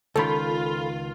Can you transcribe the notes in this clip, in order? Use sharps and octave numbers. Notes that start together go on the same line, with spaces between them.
C#2 D#3 F4 A4 B5